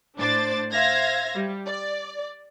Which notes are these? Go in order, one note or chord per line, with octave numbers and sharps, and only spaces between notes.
A2 D4 C5 D5 D6 A6
C5 E5 F5 G#6 A#6
G3
D5